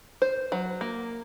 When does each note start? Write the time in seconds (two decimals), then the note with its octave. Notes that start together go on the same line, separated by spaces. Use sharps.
0.22 C5
0.52 F#3
0.81 A#3